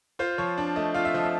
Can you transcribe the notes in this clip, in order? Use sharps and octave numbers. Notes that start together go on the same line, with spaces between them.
F4 C5
F3 C#5
D4
A3 D#5
F4 F5
E5
F3 D#5
E5